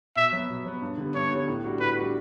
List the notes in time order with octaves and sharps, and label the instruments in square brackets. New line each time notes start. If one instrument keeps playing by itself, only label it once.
[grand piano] B2 [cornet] E5
[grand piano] F#3 B3
B2
F#3 B3
G2
D3 G3 B3
[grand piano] G2 [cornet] C#5
[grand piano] D3 G3 B3
A2
G3 D4 F#4
[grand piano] A2 [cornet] B4
[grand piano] G3 D4 F#4